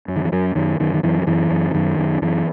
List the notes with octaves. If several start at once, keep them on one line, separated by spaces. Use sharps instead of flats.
F#2
D#3
E3
F#2 F#3
F#2 D#3
F#2 D#3
D#3
F#2 E3
F#3
F#2 E3
F#2
E3
F#2 D#3
F#2
F#2 E3